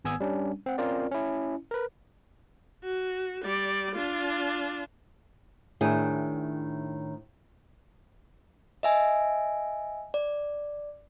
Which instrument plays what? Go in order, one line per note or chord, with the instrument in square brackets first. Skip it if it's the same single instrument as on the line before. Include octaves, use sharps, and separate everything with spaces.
[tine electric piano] G#1 B3 G#5 D#6 E6 G#6
G3 C#4 D4
C4 F#5
C4 C#4 F4 A#4 D5
C#4 E4
A#4 B4
[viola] F#4
G3 D5
D4 F4
[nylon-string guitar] A2 D#3 D4 E4 G#4
[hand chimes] D#5 E5 G#5
D5